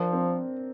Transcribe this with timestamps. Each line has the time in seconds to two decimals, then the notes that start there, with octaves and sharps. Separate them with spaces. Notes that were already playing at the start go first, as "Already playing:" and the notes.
Already playing: F3 D4 A#4
0.13 C4